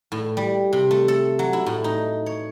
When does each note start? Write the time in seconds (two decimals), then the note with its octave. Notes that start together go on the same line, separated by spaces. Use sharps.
0.12 A2
0.37 G3
0.73 C3
0.91 A3
1.08 A4
1.39 F#3
1.53 E4
1.66 A2
1.84 D#4
2.26 C#5